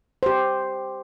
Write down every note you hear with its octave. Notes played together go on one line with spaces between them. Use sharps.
G4 C5